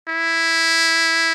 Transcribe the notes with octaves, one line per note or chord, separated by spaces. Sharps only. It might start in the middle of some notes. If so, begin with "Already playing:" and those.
E4